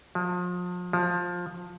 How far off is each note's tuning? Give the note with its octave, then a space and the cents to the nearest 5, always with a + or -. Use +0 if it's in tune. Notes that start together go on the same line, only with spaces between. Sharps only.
F3 +35
F3 +15